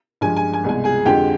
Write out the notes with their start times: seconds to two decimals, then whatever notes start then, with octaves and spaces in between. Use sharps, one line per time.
0.21 G2 F3 G#3 G#5
0.36 G#5
0.53 G#5
0.64 C2 B2 G#3 G#5
0.84 G#4 G#5
1.05 F2 D3 G#3 G4 G5